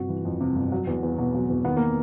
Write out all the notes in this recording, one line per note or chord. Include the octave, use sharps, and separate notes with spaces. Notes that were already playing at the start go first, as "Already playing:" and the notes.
Already playing: G1 C3 F#4
E3
F2
C3
G1
F#3
E2
E2
B2
F#3
E2
D#3 B3
A#3